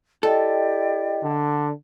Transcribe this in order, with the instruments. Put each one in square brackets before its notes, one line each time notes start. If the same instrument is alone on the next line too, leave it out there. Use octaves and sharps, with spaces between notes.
[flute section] E4 G4 D5 [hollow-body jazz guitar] A4 [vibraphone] D#5 G5
[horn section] D3